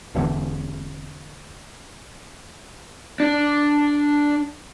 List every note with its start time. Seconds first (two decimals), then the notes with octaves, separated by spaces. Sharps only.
0.15 E1 E2 D3
3.20 D4